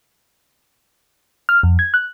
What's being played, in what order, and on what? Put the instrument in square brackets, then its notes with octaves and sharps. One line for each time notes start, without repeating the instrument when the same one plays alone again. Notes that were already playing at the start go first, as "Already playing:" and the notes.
[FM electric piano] F6
F2
G#6
F#6